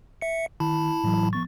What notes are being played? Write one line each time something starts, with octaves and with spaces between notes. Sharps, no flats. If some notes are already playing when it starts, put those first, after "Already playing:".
E5 C#7
D#3 E4 A5 B5
A2 E3 F#3
F3 B3 C#6 A6